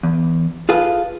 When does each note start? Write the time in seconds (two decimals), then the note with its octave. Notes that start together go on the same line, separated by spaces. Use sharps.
0.03 E2
0.69 F4 G#4 A4 B4 F5